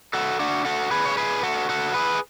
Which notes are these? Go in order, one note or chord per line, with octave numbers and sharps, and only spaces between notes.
F#4 A4
D4 F#4
F#4 A4
G#4 B4
C#5
G#4 B4
F#4 A4
F#4 A4
G#4 B4